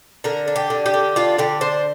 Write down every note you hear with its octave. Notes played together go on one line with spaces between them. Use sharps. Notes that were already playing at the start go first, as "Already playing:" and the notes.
D3 A#4
D4
G4
D3
G4
D3
D4 F4
D3 G4
D4 C5